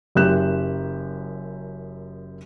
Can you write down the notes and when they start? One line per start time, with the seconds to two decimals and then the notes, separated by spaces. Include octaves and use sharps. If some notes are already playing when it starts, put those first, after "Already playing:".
0.15 F#1 F#2 G4 F#6 E7